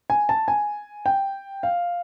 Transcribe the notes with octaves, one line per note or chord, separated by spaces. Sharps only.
G#5
A5
G#5
G5
F5